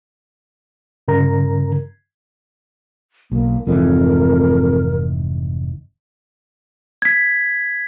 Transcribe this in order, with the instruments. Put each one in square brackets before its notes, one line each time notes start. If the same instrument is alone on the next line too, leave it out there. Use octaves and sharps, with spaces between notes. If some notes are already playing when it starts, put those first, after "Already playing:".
[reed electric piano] G2 C#3 A#4 A#5
[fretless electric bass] B1 [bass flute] A#3
[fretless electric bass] F1 G#2 E3 [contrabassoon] F2 [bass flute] A#4
[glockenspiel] G#6 B6